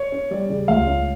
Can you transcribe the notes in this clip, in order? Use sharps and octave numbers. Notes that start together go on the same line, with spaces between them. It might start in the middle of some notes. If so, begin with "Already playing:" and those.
Already playing: C#5
C#4
G3 D5
C#3
C#2 F5
C#4